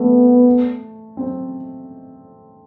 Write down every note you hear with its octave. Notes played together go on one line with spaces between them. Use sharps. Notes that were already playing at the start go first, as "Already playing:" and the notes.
Already playing: A3 B3 C4
C4